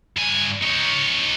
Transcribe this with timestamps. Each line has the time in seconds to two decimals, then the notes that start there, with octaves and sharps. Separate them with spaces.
0.17 G2 G#5
0.63 D#4 C#5